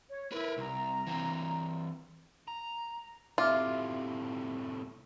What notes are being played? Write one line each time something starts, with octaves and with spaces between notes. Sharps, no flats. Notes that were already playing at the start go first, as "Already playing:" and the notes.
C#5
E4 A#4 B4
C2 A#5
E3 C4
A#5
A2 C3 F4 E5 D6 F6